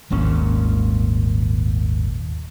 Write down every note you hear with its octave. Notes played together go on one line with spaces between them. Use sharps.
D#1 G#1 A#2 C#4